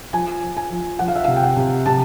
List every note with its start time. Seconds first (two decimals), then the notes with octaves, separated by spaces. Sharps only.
0.13 F3 G#5
0.42 F3
0.57 G#5
0.70 F3
0.99 F3 F#5
1.08 F5
1.15 E5
1.24 C3 F5
1.36 G5
1.43 F#5
1.56 C3
1.86 C3 A5